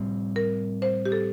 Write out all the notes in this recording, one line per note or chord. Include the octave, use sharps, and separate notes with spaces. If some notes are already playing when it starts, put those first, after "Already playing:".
Already playing: A2 G3 C4
A#4
C5
G4
A4